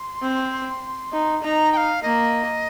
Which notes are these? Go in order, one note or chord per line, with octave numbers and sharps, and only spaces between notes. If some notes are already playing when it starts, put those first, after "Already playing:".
Already playing: C6
C4
D#4
D#4 A#5
G5
F5
A#3 D#5